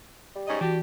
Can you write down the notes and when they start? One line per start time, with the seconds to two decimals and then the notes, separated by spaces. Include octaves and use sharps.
0.35 G3
0.48 G#2 C#4 D#5
0.61 E3 D4 F#4 G4